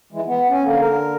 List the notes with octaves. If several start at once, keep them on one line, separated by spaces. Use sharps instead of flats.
E3 G#3
B3
C#4
D3 A#3
D3 A#4